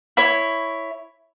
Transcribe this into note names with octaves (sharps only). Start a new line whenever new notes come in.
E4 C#5